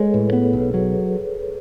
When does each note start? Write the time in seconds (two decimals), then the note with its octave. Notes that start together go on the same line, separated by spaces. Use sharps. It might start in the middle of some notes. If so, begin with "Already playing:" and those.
Already playing: G#3 G#4 A4 B4 C#5
0.13 A2 B4
0.33 B3
0.40 A4
0.53 B1
0.67 G#4
0.74 F#3